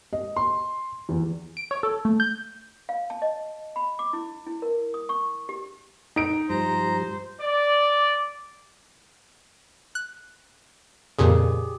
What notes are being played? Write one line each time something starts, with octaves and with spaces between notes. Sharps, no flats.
D#5
C6
E2
D7
C#5
A4
A3
G6
F5
A5
D#5
B5
D6
E4
E4
A#4
D#6
C#6
G4
D#4 D7
G2 F3 G3 C5 A#5
D5
F#6
F2 A#2 C#3 G4 G#4